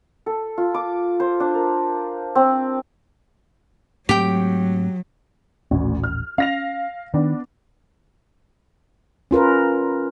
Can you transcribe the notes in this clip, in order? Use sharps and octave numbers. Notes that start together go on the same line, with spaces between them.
A4
F4
D6
C5
D4
A#4
C4
G#2 F#3 A3 C4 G4 G5
D#1 A1 D2 C#4
F6
C#4 F5 A#6 F7
D#3 B3 D4
C#4 F4 A#4 B4